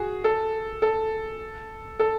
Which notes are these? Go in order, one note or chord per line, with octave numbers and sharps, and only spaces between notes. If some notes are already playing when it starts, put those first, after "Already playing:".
Already playing: F#4 G#4
A4
A4
A4